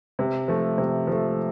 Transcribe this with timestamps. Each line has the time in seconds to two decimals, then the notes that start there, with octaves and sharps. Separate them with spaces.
0.19 C3
0.48 F3 A3
0.78 C3
1.07 F3 A3